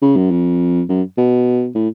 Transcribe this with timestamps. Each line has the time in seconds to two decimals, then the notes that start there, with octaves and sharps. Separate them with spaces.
0.02 C#3
0.16 F#2
0.31 F2
0.89 F#2
1.18 B2
1.75 A2